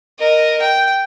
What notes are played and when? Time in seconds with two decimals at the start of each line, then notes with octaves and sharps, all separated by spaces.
0.20 A#4 D#5
0.62 G5